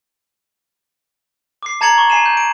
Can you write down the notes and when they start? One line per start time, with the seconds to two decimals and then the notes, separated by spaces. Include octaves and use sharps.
1.63 D6 C7
1.81 A5 A#5 G#6 A6 C#7 F#7
1.98 C#6
2.10 G#5 C7 D#7 E7
2.26 G6
2.37 D7